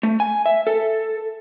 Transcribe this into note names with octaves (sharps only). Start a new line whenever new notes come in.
A3
G#5
E5
A4